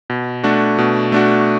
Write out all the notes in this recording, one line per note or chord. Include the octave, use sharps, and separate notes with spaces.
B2
A3 D4 F#4
B2
A3 D4 F#4